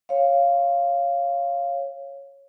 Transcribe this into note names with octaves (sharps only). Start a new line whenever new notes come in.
C#5 F5